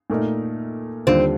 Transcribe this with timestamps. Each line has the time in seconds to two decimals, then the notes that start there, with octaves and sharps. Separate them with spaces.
0.10 A#2 A3 D#4 A#4
1.07 D#2 D3 G3 C4 D4 F4